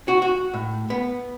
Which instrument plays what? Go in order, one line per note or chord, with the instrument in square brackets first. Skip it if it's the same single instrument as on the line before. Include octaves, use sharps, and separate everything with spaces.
[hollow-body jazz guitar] F#4
F#4
A2
B3